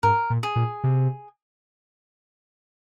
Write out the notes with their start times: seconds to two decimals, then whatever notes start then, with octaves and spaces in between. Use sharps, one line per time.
0.03 G#2 A#4
0.30 A#2
0.43 G#4
0.56 A#2
0.84 C3